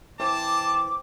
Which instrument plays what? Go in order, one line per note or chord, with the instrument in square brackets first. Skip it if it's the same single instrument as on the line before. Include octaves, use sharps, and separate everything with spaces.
[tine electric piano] E3 [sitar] C4 [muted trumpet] A5 [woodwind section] D6